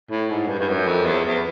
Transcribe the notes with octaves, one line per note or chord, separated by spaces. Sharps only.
A2
G#2
G2
G2
F#2
F2
E2
E2